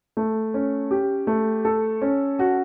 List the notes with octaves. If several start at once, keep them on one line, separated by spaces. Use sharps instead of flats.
A3
C#4
G4
A3
A4
C#4
F#4